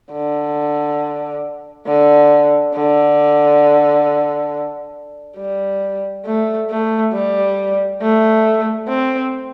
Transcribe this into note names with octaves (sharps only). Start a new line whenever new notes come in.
D3
D3
D3
G3
A3
A3
G3
A3
C4